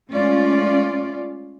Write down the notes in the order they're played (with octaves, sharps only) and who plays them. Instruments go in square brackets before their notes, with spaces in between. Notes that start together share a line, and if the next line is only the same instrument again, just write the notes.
[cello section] G#3 A3 C#4 F4 D5